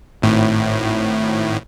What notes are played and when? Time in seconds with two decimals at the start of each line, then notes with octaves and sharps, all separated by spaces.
0.22 G#1 A2